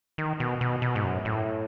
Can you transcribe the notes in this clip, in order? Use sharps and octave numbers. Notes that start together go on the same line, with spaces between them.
D#3
B2
B2
B2
G#2
F#2
A2